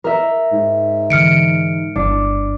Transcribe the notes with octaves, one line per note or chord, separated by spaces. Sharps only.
A#4 E5
G#2
D3 E3 F6 C#7 D7
G1 D4